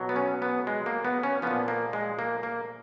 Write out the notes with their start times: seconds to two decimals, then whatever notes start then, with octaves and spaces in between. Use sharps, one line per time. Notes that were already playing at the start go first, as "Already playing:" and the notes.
Already playing: B2 F#3
0.09 B3
0.16 C#4
0.42 B3
0.67 G#3
0.86 A#3
1.05 B3
1.23 C#4
1.42 A#2 F3 B3
1.68 A#3
1.93 G#3
2.19 A#3
2.43 A#3